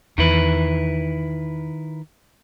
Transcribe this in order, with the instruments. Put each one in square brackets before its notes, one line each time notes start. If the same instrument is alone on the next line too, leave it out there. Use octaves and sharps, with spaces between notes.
[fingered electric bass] E2 [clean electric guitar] D#3 E4 B4